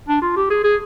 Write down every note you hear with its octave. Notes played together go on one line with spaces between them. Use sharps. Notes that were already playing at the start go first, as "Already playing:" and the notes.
D4
F4
G4
G#4
G#4